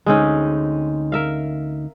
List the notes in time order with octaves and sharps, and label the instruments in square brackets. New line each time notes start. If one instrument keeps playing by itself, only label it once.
[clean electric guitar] D2 D#4 [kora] G#3 C4 C#4
[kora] A#4 E5 F5